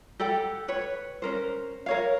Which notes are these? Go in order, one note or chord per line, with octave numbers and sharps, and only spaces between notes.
G4 A4 F#5 G5
B4 C#5
C#4 A#4 C5
A#4 C#5 F5